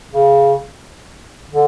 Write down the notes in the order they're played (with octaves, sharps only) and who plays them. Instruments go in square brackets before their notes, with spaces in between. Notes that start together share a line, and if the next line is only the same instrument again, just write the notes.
[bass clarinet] C#3
D3